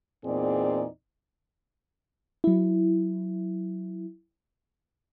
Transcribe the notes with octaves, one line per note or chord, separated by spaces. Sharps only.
E2 A#2 C4 D#4 G#4 D5
F#3 E4